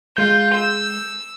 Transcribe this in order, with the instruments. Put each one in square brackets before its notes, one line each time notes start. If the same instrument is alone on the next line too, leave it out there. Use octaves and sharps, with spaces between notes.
[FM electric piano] G#3 G6 [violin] F4
[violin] E6